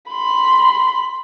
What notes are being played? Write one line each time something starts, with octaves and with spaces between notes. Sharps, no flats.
B5 C6